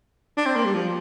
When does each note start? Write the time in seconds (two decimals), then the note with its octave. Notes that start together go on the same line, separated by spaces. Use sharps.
0.37 D4
0.46 C4
0.56 A#3
0.65 G3
0.74 F3